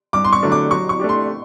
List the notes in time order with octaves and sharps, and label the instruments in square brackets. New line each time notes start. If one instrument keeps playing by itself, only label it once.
[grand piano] G2 [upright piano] D6
[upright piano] C6
C#6
[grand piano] D3 F#3 A3 D4
[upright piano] D6
[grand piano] F#3 [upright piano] C#6
[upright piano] C#6
[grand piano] A3 D4 G4
[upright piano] C6